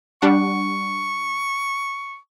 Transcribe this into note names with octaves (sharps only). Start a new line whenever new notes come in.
G3 D4 F#5 C#6